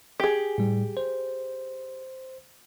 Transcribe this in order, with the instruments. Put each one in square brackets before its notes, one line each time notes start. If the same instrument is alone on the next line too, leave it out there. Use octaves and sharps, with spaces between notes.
[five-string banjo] G4 G#4
[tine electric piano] A2 G3
C5